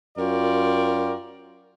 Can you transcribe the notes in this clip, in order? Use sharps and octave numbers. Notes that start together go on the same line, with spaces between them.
F#2 F4 F#4 A#4 D5 G5